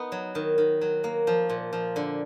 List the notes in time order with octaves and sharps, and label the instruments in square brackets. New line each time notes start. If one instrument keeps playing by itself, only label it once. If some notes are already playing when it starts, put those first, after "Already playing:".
Already playing: [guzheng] B3 D#4
F#3
D#3
D#3
F#3
A#3
F3
A#2
F3
D3